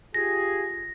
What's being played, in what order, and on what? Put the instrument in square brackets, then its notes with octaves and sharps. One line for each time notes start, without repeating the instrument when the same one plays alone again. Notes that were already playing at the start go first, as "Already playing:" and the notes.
[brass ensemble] F4 G4 G#4 [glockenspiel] A#6